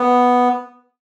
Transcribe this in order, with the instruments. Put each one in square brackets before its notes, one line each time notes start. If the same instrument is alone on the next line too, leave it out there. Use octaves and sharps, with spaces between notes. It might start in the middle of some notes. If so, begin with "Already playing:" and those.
Already playing: [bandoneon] B3